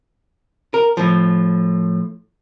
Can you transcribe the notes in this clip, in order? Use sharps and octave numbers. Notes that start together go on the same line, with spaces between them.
A#4
A2 F3